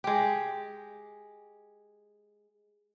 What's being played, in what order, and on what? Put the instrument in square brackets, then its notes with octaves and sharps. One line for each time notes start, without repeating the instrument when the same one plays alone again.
[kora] G#3 G4